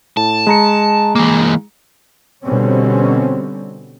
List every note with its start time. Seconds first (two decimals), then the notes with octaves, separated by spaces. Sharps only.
0.17 A2 A5
0.47 G#3 A#5 C#7
1.16 E3 A#3
2.44 B2 D3 G3 C4 C#4